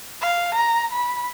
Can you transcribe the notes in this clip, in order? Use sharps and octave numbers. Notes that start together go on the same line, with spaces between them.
F5
A#5
B5